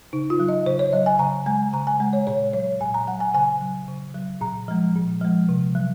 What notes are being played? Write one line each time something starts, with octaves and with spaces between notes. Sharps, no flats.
C#3 D#4
F4
F#3
D#5
C#3 C5
C#5
F#3 D#5
G#5
C#3 A#5
G#3 G#5
C#3 A#5
G#5
G#3
C#5
A#2 C#5
F#3 C#5
A#2 G#5
A#5
F#3 F#5
G#5
C#3 G#5
F#3
C#3
F#3
A#2 A#5
F3 G#3
A#2
F3 G#3
C3
F#3